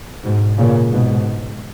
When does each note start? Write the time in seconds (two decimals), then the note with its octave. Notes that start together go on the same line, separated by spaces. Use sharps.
0.24 G#2 B2
0.57 A#2 C#3
0.92 G#2 B2